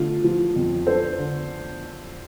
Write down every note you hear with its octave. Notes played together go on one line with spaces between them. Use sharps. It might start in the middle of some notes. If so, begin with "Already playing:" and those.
Already playing: D3 A3 F4
F3
F2
D4 A4 C5
D3